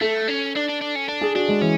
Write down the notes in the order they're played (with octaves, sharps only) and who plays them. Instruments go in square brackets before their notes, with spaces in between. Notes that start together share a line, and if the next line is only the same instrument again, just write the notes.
[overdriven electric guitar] A3 [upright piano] A4
[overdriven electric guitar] C#4
D4
D4
D4
C#4
D4
[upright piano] G#4
[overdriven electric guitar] D4 [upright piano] F#4
[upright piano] G#3
[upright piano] E3 [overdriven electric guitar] C#4